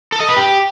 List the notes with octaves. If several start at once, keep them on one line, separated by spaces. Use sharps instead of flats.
A4
D#5
B4
G4